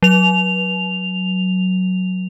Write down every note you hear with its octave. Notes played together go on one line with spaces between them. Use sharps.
F#3 F7